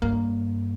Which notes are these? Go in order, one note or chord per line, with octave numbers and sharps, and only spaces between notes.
G2 A#3